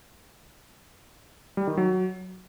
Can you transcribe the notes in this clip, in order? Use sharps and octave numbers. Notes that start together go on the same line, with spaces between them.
G3
D#3
F#3